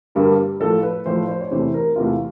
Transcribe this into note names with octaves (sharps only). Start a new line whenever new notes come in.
G2 D3 G3 A#3
A2 F3 A3 A4
B4
A2 F3 A3 C5
C5
C#5
E2 C3 E3 A3 C5
A#4
E2 C3 E3 A3 F4